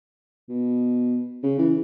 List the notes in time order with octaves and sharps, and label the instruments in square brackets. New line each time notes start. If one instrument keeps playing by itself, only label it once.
[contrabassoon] B2
C#3
E3